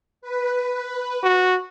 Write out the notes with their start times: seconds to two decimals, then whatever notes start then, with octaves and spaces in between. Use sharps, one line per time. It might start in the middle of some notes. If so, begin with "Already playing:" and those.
0.22 B4
1.23 F#4